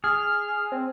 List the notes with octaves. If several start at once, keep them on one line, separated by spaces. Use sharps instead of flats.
G#4 F6
C4